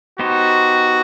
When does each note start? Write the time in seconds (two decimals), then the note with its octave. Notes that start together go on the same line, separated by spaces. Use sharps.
0.19 B3 D#4 F#4 G4 C5